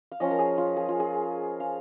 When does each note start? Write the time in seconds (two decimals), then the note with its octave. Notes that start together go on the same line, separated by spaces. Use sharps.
0.12 F5
0.20 F3 C#4 F4 D#5
0.31 A#4
0.39 G#4
0.58 F4
0.76 G#4
0.89 F4
1.00 G#4
1.60 F5